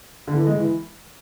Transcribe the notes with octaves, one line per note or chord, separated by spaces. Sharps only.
D3
E3
G#3
E3